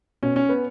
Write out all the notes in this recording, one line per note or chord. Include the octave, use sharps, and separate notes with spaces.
B2 C#4
C#4
B3